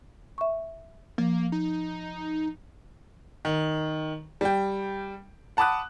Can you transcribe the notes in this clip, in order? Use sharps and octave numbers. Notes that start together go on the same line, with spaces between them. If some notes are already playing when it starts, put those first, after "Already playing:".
E5 C#6
F3 A#3
D#4
D#3
G3 G5
F#5 A5 B5 D6 D#6 F#6